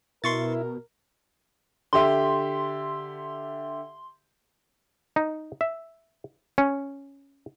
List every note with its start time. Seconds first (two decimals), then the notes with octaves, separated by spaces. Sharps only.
0.24 B2 E4 A#4 C6 C#6 A6
1.93 D3 G4 E5 C6
5.16 D#4
5.61 E5
6.58 C#4